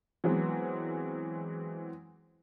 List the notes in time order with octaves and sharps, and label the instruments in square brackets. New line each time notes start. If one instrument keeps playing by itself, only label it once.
[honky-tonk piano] E3 F#3 G#3 B3 C4